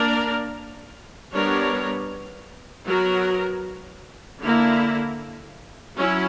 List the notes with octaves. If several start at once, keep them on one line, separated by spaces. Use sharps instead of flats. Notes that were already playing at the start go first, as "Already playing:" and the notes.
Already playing: A#3 D4 A#4 D5
G3 B3 D4 A#4 C#5
F#3 B3 F#4 A#4
D3 A#3 E4
F#3 C#4 E4